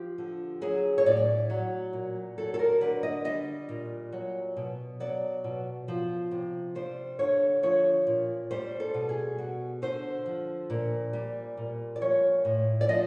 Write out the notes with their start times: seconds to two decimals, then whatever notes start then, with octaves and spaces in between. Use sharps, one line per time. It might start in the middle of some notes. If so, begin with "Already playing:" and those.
Already playing: F3 G4
0.18 D3
0.62 F#3 G#4
0.98 C#5
1.06 A2 D5
1.50 F#3
1.93 A#2
2.38 F#3 A4
2.54 A4
2.59 A#4
2.81 D3 B4
3.03 D#5
3.25 G3 D#5
3.69 A#2
4.12 F#3
4.57 B2
5.00 F#3 D5
5.44 B2
5.88 F3
6.31 C3
6.75 G3 C5
7.19 D3 C#5
7.63 F3 C#5
8.07 A#2
8.51 G3 C5
8.80 A4
8.94 B2
9.09 G#4
9.38 G3 F#4
9.82 D3 C5
10.26 F3
10.70 A#2
11.13 G3
11.57 A#2
11.96 D5
12.01 F3 C#5
12.45 A2
12.81 D5
12.89 F3 D#5